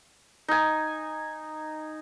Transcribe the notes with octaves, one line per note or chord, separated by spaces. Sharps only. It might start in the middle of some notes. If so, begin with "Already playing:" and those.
D#4 G#5